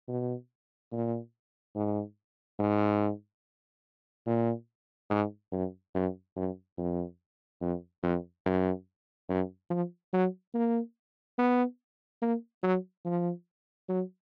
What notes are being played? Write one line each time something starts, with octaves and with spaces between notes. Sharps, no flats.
B2
A#2
G#2
G#2
A#2
G#2
F#2
F#2
F#2
F2
F2
F2
F#2
F#2
F3
F#3
A#3
B3
A#3
F#3
F3
F#3